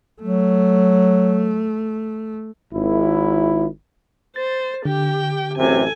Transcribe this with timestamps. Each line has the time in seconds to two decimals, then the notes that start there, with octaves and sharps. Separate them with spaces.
0.22 F#3 A3
2.73 G#1 E4
4.36 C5 A6
4.85 D3 G4 G5
5.58 A1 F#2 C3 A4 G#5